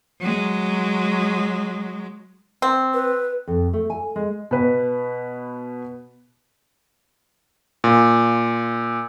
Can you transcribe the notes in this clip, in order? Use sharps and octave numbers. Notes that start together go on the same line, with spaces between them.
F#3 G#3
C4
B4
F2
A3
G#5
G#3
B2 B4
A#2